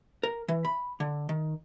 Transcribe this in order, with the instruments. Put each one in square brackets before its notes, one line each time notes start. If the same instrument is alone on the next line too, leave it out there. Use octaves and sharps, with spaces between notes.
[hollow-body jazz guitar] A#4
E3
B5
D3
D#3